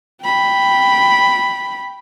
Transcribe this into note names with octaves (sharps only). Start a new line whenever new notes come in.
G5 B5